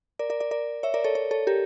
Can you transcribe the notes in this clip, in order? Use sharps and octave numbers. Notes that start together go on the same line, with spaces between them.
A#4 D5
A#4 D5
A#4 D5
A#4 D5
C#5 E5
A#4 D5
A4 C#5
A4 C#5
A4 C#5
G4 A#4